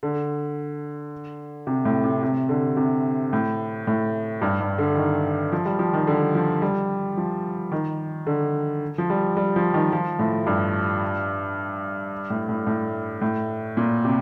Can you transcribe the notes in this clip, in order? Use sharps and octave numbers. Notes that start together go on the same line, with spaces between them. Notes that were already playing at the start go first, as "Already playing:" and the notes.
D3
C3
A2
C3
C3
D3
C3
A2
A2
G2
G2
D3
D#3
F3
G3
F3
D#3
D3
F3
G3
F3
D#3
D3
F3
G3
G3
F3
D#3
F3
A2
G2
A2
A2
A2
A2
A#2
C3